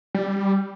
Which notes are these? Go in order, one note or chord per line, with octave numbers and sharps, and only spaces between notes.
G3